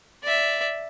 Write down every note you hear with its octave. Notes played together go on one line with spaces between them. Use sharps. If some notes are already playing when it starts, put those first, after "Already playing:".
D5 E5